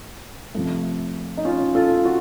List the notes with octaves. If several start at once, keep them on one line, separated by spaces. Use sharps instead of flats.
C3 F3 A3
D#4
C#4 F4
F4 A4
F#4